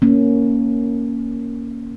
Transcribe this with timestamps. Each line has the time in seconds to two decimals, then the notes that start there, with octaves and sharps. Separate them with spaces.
0.02 A#3 C#4